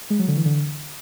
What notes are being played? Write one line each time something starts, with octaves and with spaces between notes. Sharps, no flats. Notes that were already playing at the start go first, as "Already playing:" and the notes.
G#3
F#3
D3
E3
D3